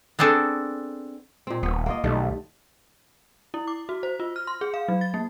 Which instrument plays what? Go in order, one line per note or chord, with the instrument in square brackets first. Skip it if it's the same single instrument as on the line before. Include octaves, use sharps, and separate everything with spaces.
[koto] B3 C4 D4 G#4 A4
[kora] A#2 C4
[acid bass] D#1 [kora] B3
[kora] A#3 F4 D#5
[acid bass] B1 [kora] D#3 G3 A3
[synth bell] E4
D6
F#4
C5
F4
F6
C6
G#4
F5
F#3
A6
A#3